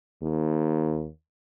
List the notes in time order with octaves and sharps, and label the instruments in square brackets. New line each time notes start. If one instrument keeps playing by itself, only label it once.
[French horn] D#2